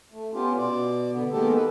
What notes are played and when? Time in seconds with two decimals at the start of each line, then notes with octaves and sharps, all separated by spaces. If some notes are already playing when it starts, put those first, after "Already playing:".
0.12 A3
0.33 B3 C#4 F4 G4
0.58 B2 D5
1.11 D3 B3
1.31 D#3 G#3 A#3 B3 G4 A4
1.55 A4 B4